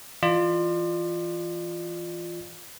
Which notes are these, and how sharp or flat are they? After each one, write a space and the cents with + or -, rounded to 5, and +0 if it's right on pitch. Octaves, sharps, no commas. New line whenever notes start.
E3 +10 F4 +0 D5 +40